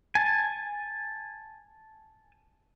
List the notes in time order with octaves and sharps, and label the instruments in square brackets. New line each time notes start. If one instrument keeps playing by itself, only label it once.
[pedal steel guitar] G#5 A5